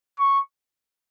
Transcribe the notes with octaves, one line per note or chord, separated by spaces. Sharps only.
C#6